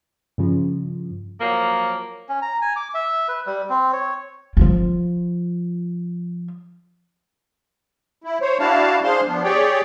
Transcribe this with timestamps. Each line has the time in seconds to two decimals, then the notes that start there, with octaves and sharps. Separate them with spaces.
0.38 G2 C#3 F3
1.40 F3 F#3 A#3
2.29 C#4
2.42 A#5
2.62 G#5
2.76 D6
2.94 E5
3.28 B4
3.47 G3
3.70 C4
3.93 C#5
4.57 F3 F4
8.24 E4
8.41 C5 C#5
8.59 D4 E4 F#4 F5 A5
9.04 D4 G#4 C5 F5 C6
9.27 F3 B3 D4
9.44 G4 G#4 C#5 D5 G5